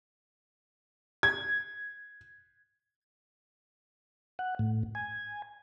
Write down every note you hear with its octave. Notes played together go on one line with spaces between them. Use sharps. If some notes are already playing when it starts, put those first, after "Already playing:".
G#6
F#5
A2
G#5